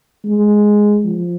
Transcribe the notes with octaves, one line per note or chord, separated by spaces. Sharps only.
G#3
F3